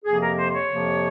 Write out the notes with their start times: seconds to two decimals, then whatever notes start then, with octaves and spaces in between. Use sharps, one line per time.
0.05 F2 C3 F3 A#3 G#4
0.20 A#4
0.37 C5
0.53 C#5
0.69 F2 C3 F3 A#3